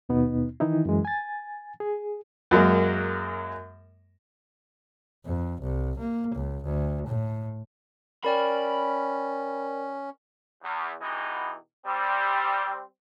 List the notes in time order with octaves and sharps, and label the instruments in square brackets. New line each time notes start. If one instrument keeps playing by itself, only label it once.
[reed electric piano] D#2 B2 B3 D#4
D#3 E3 D#4 E4
F#2 E3 G#3
G#5 A6
G#4
[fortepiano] F#2 F#3 G#3 A#3
[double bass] F2
C2
A#3
C#2
D2
A2
[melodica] C#4 [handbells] A#4 D5 G5 [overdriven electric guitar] B5
[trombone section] E2
B2 E3 G#3 B3 D#4 G4
G3 C4